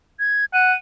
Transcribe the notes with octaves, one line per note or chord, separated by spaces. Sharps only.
G#6
F#5 D#7